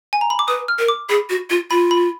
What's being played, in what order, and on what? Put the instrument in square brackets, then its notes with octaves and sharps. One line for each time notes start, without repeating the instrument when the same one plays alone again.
[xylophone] G#5
A#5
B5
D6
[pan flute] B4 [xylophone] D#6
[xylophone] F6
[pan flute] A#4
[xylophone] D6
[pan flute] G#4 [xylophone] B5
[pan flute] F#4
F4
[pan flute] F4 [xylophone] B5
[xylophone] B5